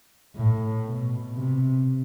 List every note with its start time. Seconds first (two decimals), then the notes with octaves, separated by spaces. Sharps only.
0.35 A2
0.86 B2
1.35 C3